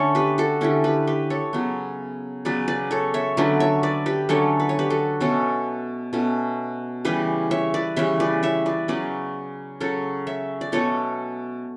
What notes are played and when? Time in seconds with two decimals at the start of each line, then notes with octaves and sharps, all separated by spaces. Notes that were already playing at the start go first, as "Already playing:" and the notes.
Already playing: D3 A3 C#4 A4 C#5
0.15 G4 B4
0.38 F#4 A4
0.61 D3 A3 C#4 E4 G4
0.84 G4 B4
1.07 G4 B4
1.30 A4 C#5
1.53 C#3 F#3 B3
2.45 C#3 F#3 B3 B4 D5
2.68 B4 D5
2.91 A4 C#5
3.14 C#5 E5
3.37 D3 F#3 A3 C#4 B4 D5
3.60 C#5 E5
3.83 B4 D5
4.06 G4 B4
4.29 D3 F#3 A3 C#4 A4 C#5
4.60 B4
4.69 C#5
4.79 G4 B4
4.90 F#4 A4
5.20 B2 A3 C#4 A4 C#5
6.13 B2 A3 C#4
7.05 C#3 E3 G3 G4 B4
7.51 C#5 E5
7.74 B4 D5
7.96 C#3 E3 G3 C#5 E5
8.20 B4 D5
8.43 C#5 E5
8.66 B4 D5
8.88 C#3 F#3 C#4 B4 D5
9.80 C#3 F#3 C#4 A4 C#5
10.27 C#5 E5
10.61 D5
10.72 B2 A3 C#4 A4 C#5